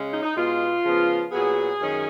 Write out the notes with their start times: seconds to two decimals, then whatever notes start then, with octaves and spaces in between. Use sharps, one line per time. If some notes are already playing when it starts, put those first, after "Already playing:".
Already playing: C#3 G#3 C#4
0.11 D#4
0.23 D#4
0.35 B2 G#3 B3 F4
0.84 C#3 F3 B3
1.32 A#2 F#3 B3 G#4
1.80 F#2 D#3 G#3 C#4